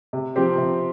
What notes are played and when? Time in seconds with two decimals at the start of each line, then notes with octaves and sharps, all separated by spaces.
0.13 C3
0.36 F3 C4 G4
0.58 C3